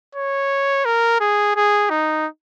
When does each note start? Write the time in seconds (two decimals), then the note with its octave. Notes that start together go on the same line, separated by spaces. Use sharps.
0.15 C#5
0.85 A#4
1.20 G#4
1.56 G#4
1.90 D#4